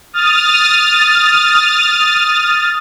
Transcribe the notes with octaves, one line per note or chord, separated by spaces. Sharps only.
D#6 F6 A6